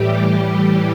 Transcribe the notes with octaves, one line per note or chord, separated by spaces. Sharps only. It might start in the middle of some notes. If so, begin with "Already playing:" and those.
Already playing: A2 E3 G3 G4